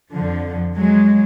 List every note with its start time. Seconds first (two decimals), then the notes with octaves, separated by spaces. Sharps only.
0.12 F2 D3 F3
0.76 F#3 G#3